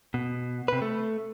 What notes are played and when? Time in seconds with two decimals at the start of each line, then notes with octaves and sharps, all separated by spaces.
0.14 B2
0.68 C3 B4
0.82 A3